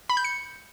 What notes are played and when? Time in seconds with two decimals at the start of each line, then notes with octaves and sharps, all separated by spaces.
0.10 B5
0.17 G6
0.25 C#7